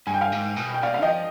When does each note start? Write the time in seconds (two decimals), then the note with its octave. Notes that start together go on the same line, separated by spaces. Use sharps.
0.07 G2 G#5
0.14 G5
0.21 F5 G#5
0.32 G#2
0.57 B2
0.74 G5
0.83 B2 D5 F5
0.94 F5
1.02 F3 D#5 G5